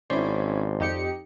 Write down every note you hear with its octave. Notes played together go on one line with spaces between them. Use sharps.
G#1 C#4 E4 C5 D5 C6
F2 D#4 G4 C#7